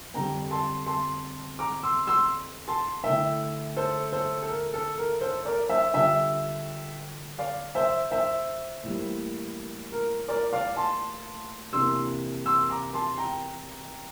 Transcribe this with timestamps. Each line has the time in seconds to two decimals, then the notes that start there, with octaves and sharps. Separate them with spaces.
0.14 F2 D3 G3 G5 A#5
0.51 A5 C6
0.86 A5 C6
1.59 A#5 D6
1.83 C6 E6
2.07 C6 E6
2.68 A5 C6
3.04 D3 A3 E4 E5 G5
3.76 A4 C5
4.12 A4 C5
4.42 A4
4.49 A#4
4.74 A4
4.98 A#4
5.21 A4 C5
5.45 A#4 D5
5.69 C5 E5
5.94 D3 G3 D4 F4 E5 G5
7.39 D5 F5
7.75 C5 E5
8.11 C5 E5
8.84 A2 E3 G3 A#3
9.92 A#4
10.28 A#4 D5
10.53 D5 F5
10.76 A5 C6
11.73 E2 C3 E3 A#3 D4 C6 E6
12.46 C6 E6
12.70 A#5 D6
12.94 A5 C6
13.18 G5 A#5